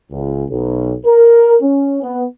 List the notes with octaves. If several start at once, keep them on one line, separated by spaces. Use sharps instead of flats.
C#2
B1
A#4
C#4
B3